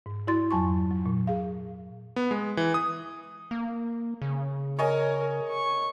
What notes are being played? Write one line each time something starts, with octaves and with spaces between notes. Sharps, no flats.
G#2
E4 F#4 D5 C6 A6
F2 F#3 G#5 A5 C6 C#6
F#3
A#2
G#4 F5
B3
G#3
E3
D#6
A#3
C#3
A#4 C#5 D#5 G#5
C#6